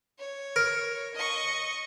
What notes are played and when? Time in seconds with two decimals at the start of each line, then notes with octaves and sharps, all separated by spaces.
0.19 C#5
0.56 A#4
1.15 D#5 C#6